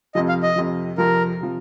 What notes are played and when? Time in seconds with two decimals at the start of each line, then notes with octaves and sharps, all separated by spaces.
0.15 F2 C3 F3 D#5
0.29 F5
0.43 D#5
0.56 F2 C3 F3
0.98 F2 C3 F3 A#4
1.41 C3 F3